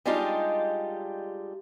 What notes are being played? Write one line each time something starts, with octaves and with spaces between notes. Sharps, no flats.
G3 G#3 D4 D#4 F4 G4